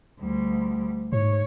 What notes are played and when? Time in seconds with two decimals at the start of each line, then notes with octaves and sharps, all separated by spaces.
0.21 D2 G3
1.12 G#2 C#5